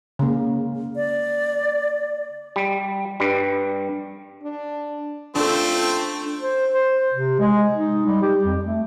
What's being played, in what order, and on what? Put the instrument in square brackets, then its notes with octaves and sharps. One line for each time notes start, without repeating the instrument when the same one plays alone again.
[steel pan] C#3 A#3
[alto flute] D5
[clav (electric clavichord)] G3
G2 G3
[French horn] D4
[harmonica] A3 C4 [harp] D4 A4 [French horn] F4
[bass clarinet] C5
C5
C3
G#3
D#4
G3
G4
F2
A3